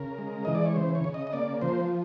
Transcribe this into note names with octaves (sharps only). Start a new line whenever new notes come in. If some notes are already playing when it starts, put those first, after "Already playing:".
Already playing: C#3 A#4
G#3
E3 D#5
D5
C#5
C#3 C5
C#5
C#3
D#5
D#5
A#3 D5
F3 C5